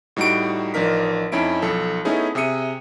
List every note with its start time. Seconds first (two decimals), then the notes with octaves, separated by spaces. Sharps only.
0.16 A2 G3 D#4 F#4 A#5 D7
0.74 A1 F3 D4 D#4 A#4 B6
1.32 F2 C#4 D#4 E4 D7
1.62 B1 F3 A4
2.05 A3 B3 C#4 D#4 E4 G#4
2.35 C3 G#4 E5 D#6 C#7 D#7